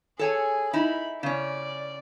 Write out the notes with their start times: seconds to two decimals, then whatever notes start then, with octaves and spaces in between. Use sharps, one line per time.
0.19 G#4 A4 C#5 G#5
0.73 D#4 E4 B5
1.23 C#3 C#4 D5